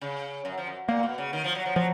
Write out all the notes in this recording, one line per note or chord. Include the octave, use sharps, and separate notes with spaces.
C#3
F#2
F3
F#2
A#2 A#3
B2
C#3
D#3
F3
F#3
F3
F3 F#3